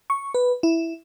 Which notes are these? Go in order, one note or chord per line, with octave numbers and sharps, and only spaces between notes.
C#6
B4
E4